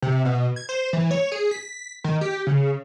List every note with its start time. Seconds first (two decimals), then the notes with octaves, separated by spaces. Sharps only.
0.02 C3
0.25 B2
0.56 G#6
0.69 C5
0.93 E3
1.11 C#5
1.32 G#4
1.51 B6
2.04 D#3
2.21 G4
2.47 C#3